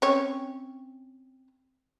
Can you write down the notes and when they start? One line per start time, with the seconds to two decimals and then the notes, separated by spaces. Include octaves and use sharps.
0.02 C4 C#4 C#5